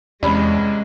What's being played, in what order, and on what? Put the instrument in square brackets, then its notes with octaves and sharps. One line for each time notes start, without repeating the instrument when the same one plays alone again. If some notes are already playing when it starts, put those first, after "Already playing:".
[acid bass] E2 [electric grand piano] C3 C#4 [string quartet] G#3 [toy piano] D5 B5